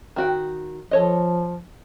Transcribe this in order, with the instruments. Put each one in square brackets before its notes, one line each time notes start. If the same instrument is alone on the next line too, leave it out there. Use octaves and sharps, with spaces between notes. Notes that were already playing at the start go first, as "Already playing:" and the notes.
[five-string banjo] D#3 F#4 G5
[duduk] F3 [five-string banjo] A4 C#5 D#5